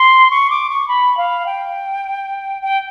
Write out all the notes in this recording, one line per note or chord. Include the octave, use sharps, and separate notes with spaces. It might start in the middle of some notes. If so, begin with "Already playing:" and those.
Already playing: C6
C#6
D6
C#6
B5
F5
G5
G5